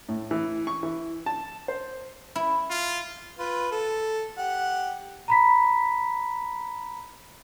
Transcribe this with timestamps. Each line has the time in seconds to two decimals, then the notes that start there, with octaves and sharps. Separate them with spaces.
0.09 A2
0.31 E3
0.67 C#6
0.83 E3
1.26 A5
1.68 C5
2.35 E4
2.70 F4
3.39 F4 B4
3.71 A4
4.38 G4 F#5
5.28 A#5 B5 B6